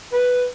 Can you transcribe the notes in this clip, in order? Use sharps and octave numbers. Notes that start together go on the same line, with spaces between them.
B4